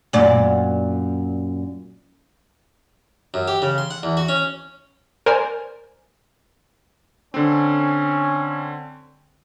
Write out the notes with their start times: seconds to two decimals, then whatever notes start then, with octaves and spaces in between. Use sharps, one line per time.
0.13 F#2 A#2 D5
3.34 F#2
3.48 G4
3.62 C#3
3.78 C6
3.91 F#5
4.03 E2
4.17 F#4
4.29 C#4
5.26 A#4 C5 D5 G#5
7.34 D3 C4 C#4